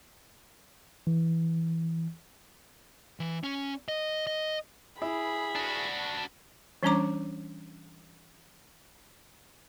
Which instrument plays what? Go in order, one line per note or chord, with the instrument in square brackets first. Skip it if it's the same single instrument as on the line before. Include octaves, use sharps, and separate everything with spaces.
[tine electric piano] E3
[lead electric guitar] E3
C#4
D#5
D#5
[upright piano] E4 [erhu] G#4 [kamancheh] B5
[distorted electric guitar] D4 F#4
[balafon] E3 G3 C#4 D4 A#5 D6